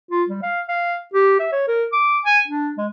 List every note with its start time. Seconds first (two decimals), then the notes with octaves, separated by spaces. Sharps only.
0.11 F4
0.29 G3
0.43 F5
0.68 F5
1.14 G4
1.40 E5
1.52 C#5
1.68 A#4
1.93 D6
2.25 G#5
2.48 D4
2.78 G#3